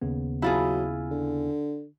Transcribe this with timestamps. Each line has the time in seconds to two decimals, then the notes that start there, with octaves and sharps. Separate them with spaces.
0.02 D#2 C#3 B3
0.42 F#3 E4 F4 G#4
1.11 D3